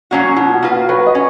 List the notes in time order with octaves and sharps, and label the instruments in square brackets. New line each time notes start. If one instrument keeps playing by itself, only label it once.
[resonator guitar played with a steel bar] F#3 A#3 C#4 F#4
[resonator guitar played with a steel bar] B2 [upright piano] F4
[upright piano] F#4
[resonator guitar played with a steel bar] A#3 F4 B4
[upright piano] F#4
[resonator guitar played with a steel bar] F#3 [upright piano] B4
[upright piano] D#5
[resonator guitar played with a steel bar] C#4